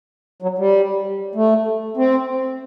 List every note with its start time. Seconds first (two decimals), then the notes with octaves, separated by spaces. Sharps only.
0.42 F#3
0.58 G3
1.35 A3
1.97 C4